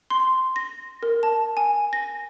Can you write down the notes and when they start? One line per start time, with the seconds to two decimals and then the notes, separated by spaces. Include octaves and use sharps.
0.10 C6
0.56 A#6
1.03 A#4
1.23 A5
1.57 G#5
1.93 A#6